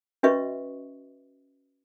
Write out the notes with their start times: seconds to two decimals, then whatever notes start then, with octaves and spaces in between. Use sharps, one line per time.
0.23 C#4 F#4 B4 D#5 E5 C#6